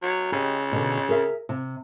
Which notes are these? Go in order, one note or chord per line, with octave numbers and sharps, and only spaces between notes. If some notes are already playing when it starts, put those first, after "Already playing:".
F#3
C#3 G4 D#5
B2 D3
G#4 A#4 E5
C3